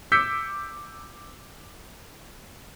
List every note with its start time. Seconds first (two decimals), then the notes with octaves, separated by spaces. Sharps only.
0.12 D6 E6 G6 B6 C#7